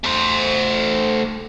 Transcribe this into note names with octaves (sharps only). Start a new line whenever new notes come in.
A3 C5